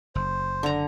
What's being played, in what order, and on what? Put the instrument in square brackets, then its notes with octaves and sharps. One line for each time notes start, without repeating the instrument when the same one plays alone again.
[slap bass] F#1 [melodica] C5
[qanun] D3 A#5